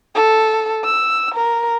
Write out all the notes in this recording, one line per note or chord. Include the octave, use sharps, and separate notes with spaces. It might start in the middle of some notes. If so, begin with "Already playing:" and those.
A4
E6
A#4